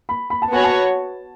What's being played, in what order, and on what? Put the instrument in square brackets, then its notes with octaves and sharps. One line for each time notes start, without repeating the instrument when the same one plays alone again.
[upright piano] B5
B5
A5
[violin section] B3 F#4 C#5 [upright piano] G#5
[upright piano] A5